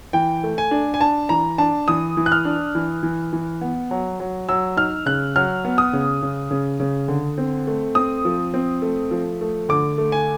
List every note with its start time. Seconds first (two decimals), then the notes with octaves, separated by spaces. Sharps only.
0.13 E3 G5
0.43 A3
0.58 G#5
0.71 D4
0.94 G#5
1.01 D4 A5
1.29 E3 A#5
1.58 D4 A5
1.88 E3 D#6
2.17 E3
2.26 F#6
2.32 F6
2.45 D4
2.75 E3
3.03 E3
3.33 E3
3.61 B3
3.91 F#3
4.20 F#3
4.49 F#3 E6
4.77 D#4 F6
5.06 C#3 F#6
5.36 F#3 F6
5.65 B3
5.78 D#6
5.93 C#3
6.23 C#3
6.51 C#3
6.80 C#3
7.08 D3
7.38 C4
7.67 A3
7.95 C4 D#6
8.25 F3
8.54 C4
8.82 A3
9.11 F3
9.41 A3
9.69 D3 D6
9.98 A3
10.12 G#5